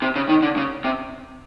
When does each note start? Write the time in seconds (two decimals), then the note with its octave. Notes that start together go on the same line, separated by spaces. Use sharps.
0.02 C3
0.16 C#3
0.29 D#3
0.42 D3
0.57 C#3
0.84 C3